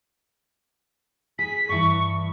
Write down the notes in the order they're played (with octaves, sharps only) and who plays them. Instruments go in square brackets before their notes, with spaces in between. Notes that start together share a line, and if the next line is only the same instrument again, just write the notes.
[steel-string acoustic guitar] G#4 [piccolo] B6
[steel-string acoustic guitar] G2 E3 [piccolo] C#6